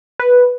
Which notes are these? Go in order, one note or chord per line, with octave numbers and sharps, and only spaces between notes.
B4